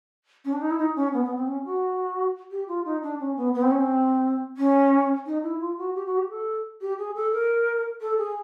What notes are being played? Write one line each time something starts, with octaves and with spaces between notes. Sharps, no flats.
C#4
D4
D#4
E4
D#4
C#4
B3
B3
C4
C#4
F#4
G4
F4
D#4
D4
C#4
B3
B3
C4
C#4
C4
C#4
D#4
E4
F4
F#4
G4
F#4
G4
A4
G4
G#4
A4
A#4
A4
G#4